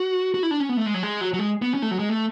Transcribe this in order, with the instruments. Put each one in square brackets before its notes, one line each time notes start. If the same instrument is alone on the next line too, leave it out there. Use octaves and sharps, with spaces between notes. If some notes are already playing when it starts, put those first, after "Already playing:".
Already playing: [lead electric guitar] F#4
F#4
E4
D4
C#4
B3
A3
G#3
F#3
G#3
F#3
F#3
G#3
B3
C#4
A3
F#3
G#3
A3